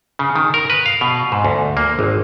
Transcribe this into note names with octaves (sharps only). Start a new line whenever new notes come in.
C#3
D#3
A#4
B4
F5
B2
G#2
D2
A#3
G#1